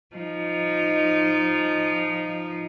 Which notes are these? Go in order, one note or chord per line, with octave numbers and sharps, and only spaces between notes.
F3 D#4